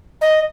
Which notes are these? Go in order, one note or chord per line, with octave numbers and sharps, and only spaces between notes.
D#5